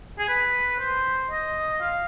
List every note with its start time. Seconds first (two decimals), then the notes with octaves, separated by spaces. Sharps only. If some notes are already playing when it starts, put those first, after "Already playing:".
0.19 G#4
0.28 B4
0.79 C5
1.30 D#5
1.81 F5